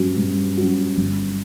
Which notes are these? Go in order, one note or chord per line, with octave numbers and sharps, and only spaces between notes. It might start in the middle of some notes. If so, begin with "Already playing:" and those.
Already playing: G2 F#3 C#4 F#4
G2
F#3 C#4 F#4
G1